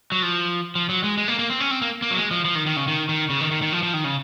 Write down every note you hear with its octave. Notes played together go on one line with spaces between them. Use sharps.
F#3
F3
F3
F#3
G#3
G#3
A#3
A#3
C4
C#4
C4
A#3
A#3
F#3
G#3
F3
F3
D#3
D#3
C#3
D#3
D#3
C#3
D#3
D#3
D#3
F3
F3
D#3
C#3